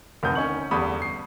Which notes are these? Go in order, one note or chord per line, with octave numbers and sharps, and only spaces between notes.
F1 D2 D#3 A#4 D#6 G6
C#4 D#4 C#6 F#7
E2 G2 D3 B5 C#6 D#6
C7